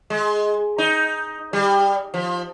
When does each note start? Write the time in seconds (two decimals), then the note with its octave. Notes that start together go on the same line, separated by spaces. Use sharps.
0.10 G#3
0.78 D#4
1.53 G3
2.14 F3